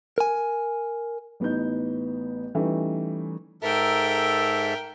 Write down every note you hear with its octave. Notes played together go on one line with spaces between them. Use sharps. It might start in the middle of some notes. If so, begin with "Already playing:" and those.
A#4 G#5
A1 B3 D#4 G6
E3 G3 A3 C#4 D#4
G#2 A4 A#4 E5 G5